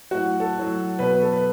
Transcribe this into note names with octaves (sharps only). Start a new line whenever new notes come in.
A2 F#3 F#4
A4
A2 F#3
B2 F#3 B4
B4
A4
B4